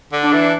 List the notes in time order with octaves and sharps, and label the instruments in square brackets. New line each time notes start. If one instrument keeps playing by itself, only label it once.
[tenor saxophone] D3
[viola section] D4
[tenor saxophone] E3